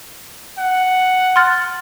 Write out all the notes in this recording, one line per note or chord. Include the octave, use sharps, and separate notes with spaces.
F#5
C6 F6 A6